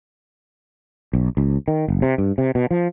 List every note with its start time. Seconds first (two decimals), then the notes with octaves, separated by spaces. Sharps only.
1.13 B1
1.37 C#2
1.68 D#3
1.88 F#1
2.02 C3
2.18 G2
2.38 C3
2.55 B2
2.71 F3